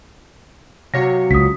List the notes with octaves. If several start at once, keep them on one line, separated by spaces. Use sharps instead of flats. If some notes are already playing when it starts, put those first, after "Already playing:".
C3 F#3 F#4 C#5 F5 A#6 C#7
C#2 D#6 B6